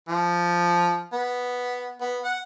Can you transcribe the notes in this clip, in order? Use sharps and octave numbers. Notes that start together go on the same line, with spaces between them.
F3
B3
B3
F#5